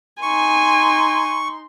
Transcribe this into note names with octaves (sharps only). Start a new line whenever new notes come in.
D#4 G#5 C6 C#6